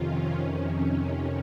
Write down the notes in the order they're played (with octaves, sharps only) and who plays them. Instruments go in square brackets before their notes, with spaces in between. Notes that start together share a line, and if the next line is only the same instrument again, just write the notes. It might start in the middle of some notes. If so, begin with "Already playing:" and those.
Already playing: [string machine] F2 C3 D#3 C#4 F4
F2 C3 D#3 C#4